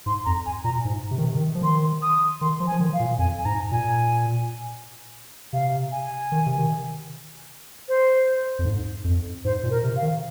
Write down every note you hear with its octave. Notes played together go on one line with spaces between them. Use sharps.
G#2 C6
F2 A#5
G#5
A#2 A#5
G#2
C3
D#3
C3
D#3
F3
D#3 C6
D#6
D#3 C6
F3
G#5
F3
D#3
F5
A#2
F2 G#5
G#5
G#2 A#5
A#2 G#5
C3 F5
G#5
D#3
C3
D#3
C5
F2
G#2
F2
G#2 C5
A#2
A#4
C3
F5
D#3